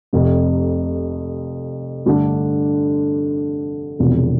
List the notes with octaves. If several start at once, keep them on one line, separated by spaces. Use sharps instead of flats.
F1 F2 C3
G2 D3 A3 D4
E1 E2 C3 F3